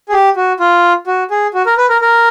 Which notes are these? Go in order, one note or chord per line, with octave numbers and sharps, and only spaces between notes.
G#4
G4
F#4
F4
F#4
G#4
F#4
A#4
B4
A#4
A#4